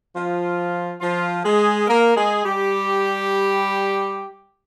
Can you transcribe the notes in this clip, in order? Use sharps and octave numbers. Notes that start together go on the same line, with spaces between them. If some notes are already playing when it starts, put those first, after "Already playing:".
F3 F4
F3 F4
G#3 G#4
A#3 A#4
G#3 G#4
G3 G4